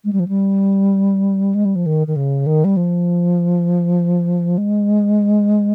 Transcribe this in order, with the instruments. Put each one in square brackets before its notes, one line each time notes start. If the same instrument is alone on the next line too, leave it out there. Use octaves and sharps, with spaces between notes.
[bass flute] G#3
G3
F3
G3
G#3
G3
F3
D#3
D#3
C#3
D#3
G3
F3
G#3